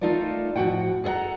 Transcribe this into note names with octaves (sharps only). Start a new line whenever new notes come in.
A3 D#4 F4 A4 A#4 D5
A2 F3 D4 F#4 F#5 G5
G#4 A4 D5 F#5 A#5